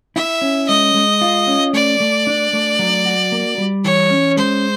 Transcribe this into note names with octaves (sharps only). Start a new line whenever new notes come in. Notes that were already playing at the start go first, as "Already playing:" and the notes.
E4 E5
C#4
G#3 D#5
G#3
F4
C#4
A3 D5
A3
D4
A3
F#3
F#4
A#3
G3
E3 C#5
C#4
G#3 C5